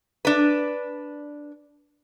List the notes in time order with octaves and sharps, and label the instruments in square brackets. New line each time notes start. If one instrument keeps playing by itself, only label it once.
[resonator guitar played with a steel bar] D4 B4